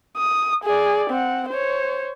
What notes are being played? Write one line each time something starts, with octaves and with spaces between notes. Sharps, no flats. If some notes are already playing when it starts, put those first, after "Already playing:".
D#6
G#4 D5
C4 F#5
C5 C#5